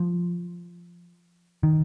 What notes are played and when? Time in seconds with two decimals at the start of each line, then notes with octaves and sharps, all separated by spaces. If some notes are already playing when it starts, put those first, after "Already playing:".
Already playing: F3
1.63 D#3